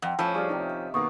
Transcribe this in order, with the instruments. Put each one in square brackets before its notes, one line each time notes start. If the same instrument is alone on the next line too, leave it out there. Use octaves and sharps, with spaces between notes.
[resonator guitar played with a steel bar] F2 [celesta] F#5 G5
[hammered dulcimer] A2 D#5 [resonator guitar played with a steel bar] F3 C#4 [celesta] A5 B5 [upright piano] E6
[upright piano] G3 F4 G#4 [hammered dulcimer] D4 [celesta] C#6 F6
[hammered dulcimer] C3 D#3 F5 [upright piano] D#4
[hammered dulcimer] E5
[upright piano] B2 D#3 A#3 [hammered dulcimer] B3 [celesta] C#6 D#6